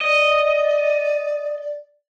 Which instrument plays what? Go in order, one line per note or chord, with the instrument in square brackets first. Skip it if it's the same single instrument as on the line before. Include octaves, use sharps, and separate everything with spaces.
[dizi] D5 [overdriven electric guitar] D#5